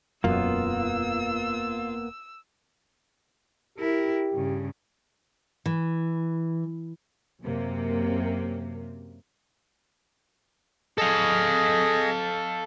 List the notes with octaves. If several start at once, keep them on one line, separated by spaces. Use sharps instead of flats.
E1 F#2 A#3 B3 F4 E6
E4 G4 A#4
G2 C#3
E3
F#2 C3 A#3
G#4 A4 D#5 F5